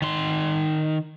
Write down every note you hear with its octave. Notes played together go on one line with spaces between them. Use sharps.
D#3 C6